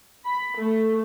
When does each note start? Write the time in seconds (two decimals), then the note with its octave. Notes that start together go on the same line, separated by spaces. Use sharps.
0.26 B5
0.56 A3